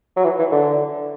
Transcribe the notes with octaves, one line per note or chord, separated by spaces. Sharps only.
F#3
E3
E3
D3